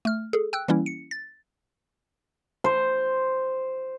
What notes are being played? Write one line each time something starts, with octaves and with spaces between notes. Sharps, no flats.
A3 F6
G#4 A4
G5 E6 F#6
E3 G3 A#3 C#4 E4
C#7
A6
C5